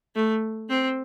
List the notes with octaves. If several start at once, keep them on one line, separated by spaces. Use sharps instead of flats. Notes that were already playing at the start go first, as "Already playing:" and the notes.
A3
C4